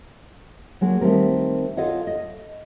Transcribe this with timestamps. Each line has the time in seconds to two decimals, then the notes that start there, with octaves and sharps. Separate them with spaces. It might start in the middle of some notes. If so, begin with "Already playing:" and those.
0.81 F#3 G#3 A#3 D4
1.01 D#3 G3 A3 C4 A#4
1.77 F4 A4 C#5 D#5 F5 F#5
2.07 D#5